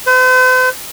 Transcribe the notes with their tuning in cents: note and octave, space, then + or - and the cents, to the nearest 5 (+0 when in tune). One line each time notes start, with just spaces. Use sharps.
C5 -45